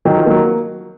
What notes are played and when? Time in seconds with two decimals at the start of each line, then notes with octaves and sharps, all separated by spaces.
0.05 D#3 F#3
0.17 F3
0.26 F#3 A#3